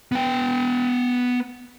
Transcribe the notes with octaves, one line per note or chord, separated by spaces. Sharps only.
B3 G5